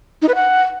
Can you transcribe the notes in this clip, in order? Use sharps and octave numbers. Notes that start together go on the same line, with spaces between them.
D#4
B4
F#5